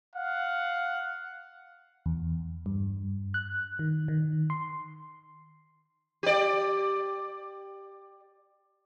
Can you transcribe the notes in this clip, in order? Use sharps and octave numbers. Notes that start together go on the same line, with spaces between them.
F5 F#5
E2
G2
F#6
D#3
D#3
C6
G4 D5